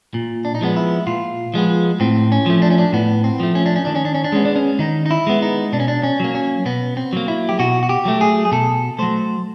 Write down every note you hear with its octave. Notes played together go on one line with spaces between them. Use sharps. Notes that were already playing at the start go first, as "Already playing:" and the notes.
A#2
D4
D#4
F3 G#3 B3 D4
E4
A#2 F4
F3 G#3 B3
A2 C4
C#4
F3 A3
D4
C#4
D4
A2 B3
C4
F3 A3
C#4
D4
C#4
D#3 D4
C#4
D4
C#4
D4
G#3 B3 C#4
D4
C#4
D#3 D#4
D#4
E4
G#3 B3
D#4
B2 D4
C#4
D4
C#4
F#3 A#3
C#4
B2 B3
C4
F#3 A#3
E4
G4
B2 F#4
F#4
G4
F#3 A3
G#4
G#4
B2 A4
F#3 A3 C5